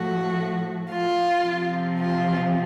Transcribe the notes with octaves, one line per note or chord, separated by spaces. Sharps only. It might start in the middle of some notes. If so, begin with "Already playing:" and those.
Already playing: A2 F3 A3 F#4
F4
C3 F3 C4
F4